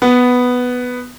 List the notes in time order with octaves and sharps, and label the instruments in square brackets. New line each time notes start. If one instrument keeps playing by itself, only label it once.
[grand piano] B3